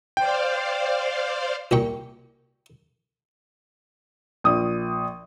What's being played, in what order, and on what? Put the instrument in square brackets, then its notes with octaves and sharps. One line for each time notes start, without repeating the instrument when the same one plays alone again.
[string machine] C5 D5 F5 [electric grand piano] G5
[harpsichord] C2 A#2 G5 C#6
[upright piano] A#1 D#6